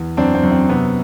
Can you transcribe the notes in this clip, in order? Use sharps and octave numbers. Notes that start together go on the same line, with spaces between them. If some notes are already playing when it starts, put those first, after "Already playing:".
Already playing: E2
F#2 C4 D4
C4
F#2
C4
C3 B3